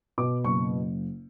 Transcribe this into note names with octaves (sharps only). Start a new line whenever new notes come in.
B2 D6
F#1 C#6